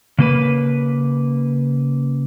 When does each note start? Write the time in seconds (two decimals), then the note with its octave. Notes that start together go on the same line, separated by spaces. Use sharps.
0.19 C#3 A#3 B4